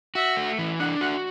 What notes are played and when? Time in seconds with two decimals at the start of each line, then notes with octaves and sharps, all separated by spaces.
0.15 F#4 E5
0.37 A3
0.59 E3
0.79 D4 F#5
1.01 F#4 F#5